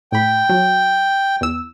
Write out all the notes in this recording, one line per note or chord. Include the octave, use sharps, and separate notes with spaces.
A2 G5 B5
F#3
E2 E6